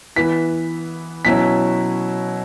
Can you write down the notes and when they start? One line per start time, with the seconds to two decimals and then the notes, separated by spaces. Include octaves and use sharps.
0.16 E3 B3 E4 B6
1.25 B2 F#3 C#4 E4 B6